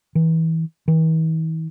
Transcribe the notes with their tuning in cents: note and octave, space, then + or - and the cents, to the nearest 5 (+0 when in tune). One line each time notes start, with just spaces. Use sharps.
E3 -25
E3 -45